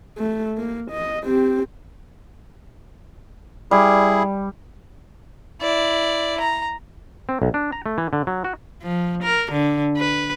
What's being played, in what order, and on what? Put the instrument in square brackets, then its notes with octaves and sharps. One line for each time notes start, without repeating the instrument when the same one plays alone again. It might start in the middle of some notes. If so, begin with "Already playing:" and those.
[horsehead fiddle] A3
A#3
D#5
C4 G4
[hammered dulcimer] G3 [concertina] E4 G#4
[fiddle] E4 D5
A#5
[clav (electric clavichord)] C4
B1
D4
A#5
A3
E3
D3
F#3
F#4
[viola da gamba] F3
A#4
D3
B4